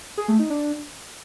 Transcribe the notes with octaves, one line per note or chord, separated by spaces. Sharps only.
G#4
A3
D#4
D4